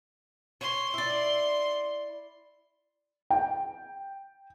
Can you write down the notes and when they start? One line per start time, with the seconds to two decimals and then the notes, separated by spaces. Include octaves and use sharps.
0.61 C#5 C6
0.94 E4 D5
3.30 G5